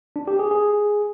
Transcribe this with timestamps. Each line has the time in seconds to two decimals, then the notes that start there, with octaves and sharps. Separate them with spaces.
0.16 D4
0.28 G4
0.39 G#4
0.51 G#4